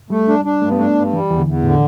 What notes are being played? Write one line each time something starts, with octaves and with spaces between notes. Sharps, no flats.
G3 A3
D4
D4
G2 A3
B3
A3 D4
G2
E3 G3
E2 E3
D3
E2
A2 D3